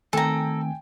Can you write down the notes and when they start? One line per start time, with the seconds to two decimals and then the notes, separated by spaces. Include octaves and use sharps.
0.13 D#3 A3 C4 A4 G5 G#5 A#5